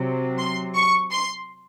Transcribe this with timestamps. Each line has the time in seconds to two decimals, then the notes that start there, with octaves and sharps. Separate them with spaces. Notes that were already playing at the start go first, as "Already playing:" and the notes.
Already playing: C3 F#3
0.39 C6
0.75 C#6
1.12 C6